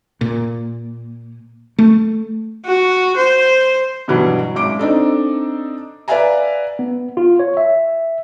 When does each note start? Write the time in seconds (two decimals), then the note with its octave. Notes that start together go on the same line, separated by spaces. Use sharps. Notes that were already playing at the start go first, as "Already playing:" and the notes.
0.21 A#2
1.79 A3
2.66 F#4
3.17 C5
4.08 G2 B2 E3 F#3 B3
4.55 G#1 F#2 D6 D7
4.79 C4 D4 D#4 A4
6.08 B4 D5 E5 F5 G#5 A#5
6.79 B3
7.17 F4
7.39 C#5
7.57 E5